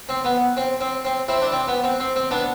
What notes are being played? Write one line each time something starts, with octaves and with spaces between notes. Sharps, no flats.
C4
B3
C4
C4
C4
C4 E4
D4
C4
B3
C4
C4
C4
B3 D4